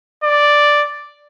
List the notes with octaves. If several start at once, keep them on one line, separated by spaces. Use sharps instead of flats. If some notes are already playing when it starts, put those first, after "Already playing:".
D5